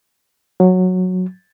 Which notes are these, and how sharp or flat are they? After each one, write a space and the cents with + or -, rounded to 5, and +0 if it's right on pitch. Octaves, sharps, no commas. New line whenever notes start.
F#3 -10